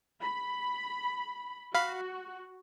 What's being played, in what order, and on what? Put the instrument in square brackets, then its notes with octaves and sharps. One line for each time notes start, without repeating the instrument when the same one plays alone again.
[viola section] B5
[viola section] F#4 [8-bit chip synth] F5 B5